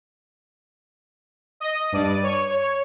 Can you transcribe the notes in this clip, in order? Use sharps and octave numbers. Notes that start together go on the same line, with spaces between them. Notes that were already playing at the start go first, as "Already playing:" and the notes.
D#5 D#6
G2 D5 D#7
C#5
C#5